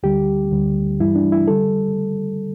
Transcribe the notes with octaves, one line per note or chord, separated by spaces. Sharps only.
D2 D3 G3 G4
D2 D3 G3
G2 E3 G3 E4
D4
E4
D3 G3 A4